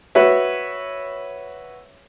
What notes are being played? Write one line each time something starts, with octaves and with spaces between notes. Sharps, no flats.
F#4 B4 C#5 E5